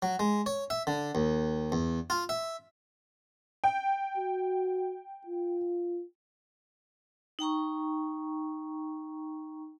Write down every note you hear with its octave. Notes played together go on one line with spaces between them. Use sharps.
F#3
G#3
C#5
E5
D3
D#2
E2
F4
E5
G5
F#4
F4
D#4 G5 A#5 C#6